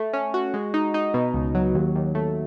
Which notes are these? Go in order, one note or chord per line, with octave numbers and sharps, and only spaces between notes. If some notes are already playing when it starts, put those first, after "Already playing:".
Already playing: A3
C#4
F#4
G#3
D#4
D#4
B2
C#2
F#3
D#2
D#2
A3